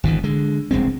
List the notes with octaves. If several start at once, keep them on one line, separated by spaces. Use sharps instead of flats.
G#1 B2 D3 E3
D3 G#3
E1 C2 G#3 C4